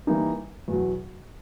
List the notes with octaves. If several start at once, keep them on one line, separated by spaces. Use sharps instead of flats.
E3 G3 A#3 D#4
E2 B2 F#3